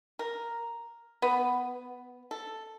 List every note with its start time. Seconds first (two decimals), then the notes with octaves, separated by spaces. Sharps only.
0.19 A#4
1.22 B3
2.31 A4